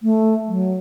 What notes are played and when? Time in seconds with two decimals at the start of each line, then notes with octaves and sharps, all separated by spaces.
0.03 A3
0.48 F#3